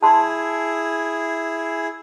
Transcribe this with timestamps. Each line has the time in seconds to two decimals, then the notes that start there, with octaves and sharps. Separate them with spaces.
0.03 E4 G#4 A5 C6